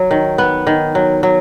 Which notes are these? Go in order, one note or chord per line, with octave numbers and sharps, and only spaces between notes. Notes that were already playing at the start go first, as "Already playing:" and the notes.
Already playing: F#3
D#3
B3
D#3
F#3
F#3